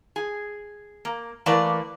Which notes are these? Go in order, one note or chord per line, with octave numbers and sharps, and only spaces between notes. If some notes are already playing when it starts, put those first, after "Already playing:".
G#4
A#3
E3 A3 A#3 B4 D5